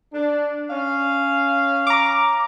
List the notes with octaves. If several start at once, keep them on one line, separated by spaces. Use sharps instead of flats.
D4
C#4 F5
A#5 D6